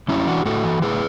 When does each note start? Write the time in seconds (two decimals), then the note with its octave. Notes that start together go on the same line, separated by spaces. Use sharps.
0.08 F#2 C#4 E4
0.27 E3 D4 F#4
0.45 A2 F#4 A4
0.64 E3
0.82 A2 G#4 B4